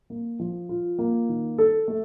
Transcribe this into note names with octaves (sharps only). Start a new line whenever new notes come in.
A#3
F3
F4
A#3
D#3
A4
A3